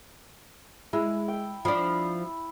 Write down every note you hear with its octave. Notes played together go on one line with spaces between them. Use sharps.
G#3 E4
G5
F3 D4 B5